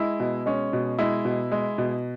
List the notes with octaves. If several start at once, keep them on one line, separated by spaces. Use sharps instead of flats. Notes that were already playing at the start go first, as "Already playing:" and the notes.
Already playing: G#3 E4
B2
G#3 C#4
B2
G#3 E4
B2
G#3
B2